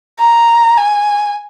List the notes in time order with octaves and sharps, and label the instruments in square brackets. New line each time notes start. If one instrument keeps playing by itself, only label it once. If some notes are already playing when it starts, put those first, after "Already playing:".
[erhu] A#5
G#5